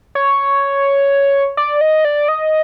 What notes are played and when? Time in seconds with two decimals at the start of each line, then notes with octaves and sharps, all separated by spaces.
0.15 C#5
1.57 D5
1.81 D#5
2.05 D5
2.28 D#5